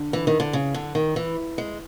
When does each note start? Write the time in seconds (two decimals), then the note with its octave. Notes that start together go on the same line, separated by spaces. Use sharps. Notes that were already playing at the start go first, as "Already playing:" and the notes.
Already playing: D3
0.13 E3
0.27 D#3
0.40 D3
0.53 C#3
0.74 D3
0.95 D#3
1.16 E3
1.58 G#3